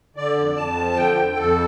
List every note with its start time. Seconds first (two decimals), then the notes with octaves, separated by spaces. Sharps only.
0.16 D3 D5
0.37 F2
0.56 F2 A5
0.77 F3
0.97 D3 G5
1.16 F2
1.36 F2 A4